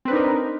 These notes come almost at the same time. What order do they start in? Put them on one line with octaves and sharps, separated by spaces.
C4 B4 D4 D#4 A#4